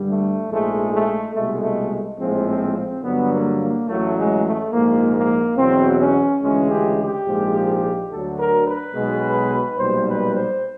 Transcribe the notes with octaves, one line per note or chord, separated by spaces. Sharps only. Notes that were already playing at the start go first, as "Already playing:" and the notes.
Already playing: G2 D3 G3
A3
A#1 G#2 F3 G#3 A3
A3
C2 B2 G#3 A3
A3
A#1 A2 F3 G#3 C4
C4
C4
G2 D3 F#3 B3
A#3
A#3
A1 A2 F#3 A3
G#3
A3
A#1 G#2 F3 A#3
A#3
E2 B2 F#3 C4
C#4
D2 C#3 E3 G#3 C#4
G4
G4
A#1 G#2 F3 G#3
D2 D3 F#3 A4
A#4
B4
B1 B2 G#3
B1 A#2 G3 C5
B4
C5